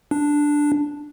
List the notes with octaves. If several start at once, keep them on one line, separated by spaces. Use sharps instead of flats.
D4